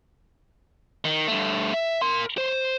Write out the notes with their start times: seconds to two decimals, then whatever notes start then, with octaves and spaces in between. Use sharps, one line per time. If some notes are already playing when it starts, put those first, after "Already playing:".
1.05 D#3
1.27 G2 A3
1.74 E5
2.02 A#4 C6
2.38 C5